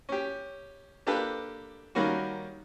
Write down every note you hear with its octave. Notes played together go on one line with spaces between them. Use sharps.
C#4 G4
A#3 D4 G4 A4 B4
D#3 G3 A#3 C#4 F#4